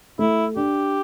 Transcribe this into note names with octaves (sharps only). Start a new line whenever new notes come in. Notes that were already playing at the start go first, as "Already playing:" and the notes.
A3 E4
D4 G4